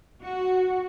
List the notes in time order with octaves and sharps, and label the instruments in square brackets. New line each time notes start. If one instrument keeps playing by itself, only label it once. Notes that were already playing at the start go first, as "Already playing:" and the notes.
[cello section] F#4